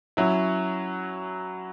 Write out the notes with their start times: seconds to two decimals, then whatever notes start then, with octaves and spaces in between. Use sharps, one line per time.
0.17 F#3 C#4 E4